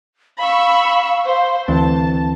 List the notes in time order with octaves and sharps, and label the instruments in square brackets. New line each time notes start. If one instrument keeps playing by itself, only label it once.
[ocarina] F5 [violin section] B5 C#6 E6
[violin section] C5
[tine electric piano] D2 E3 C4 [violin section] A5